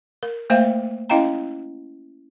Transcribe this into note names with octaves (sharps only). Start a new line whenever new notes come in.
A#4
A3 A#3 C5 E5 F5 G5
C#4 E4 D#5 F5 G5 A#5